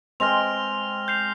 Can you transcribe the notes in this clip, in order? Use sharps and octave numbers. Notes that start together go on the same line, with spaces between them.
G#3 C4 F6 A#6 F7
G6 C7 F7